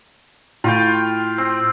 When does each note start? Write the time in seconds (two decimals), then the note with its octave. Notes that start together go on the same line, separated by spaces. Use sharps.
0.64 A2 F4 G5
1.38 C4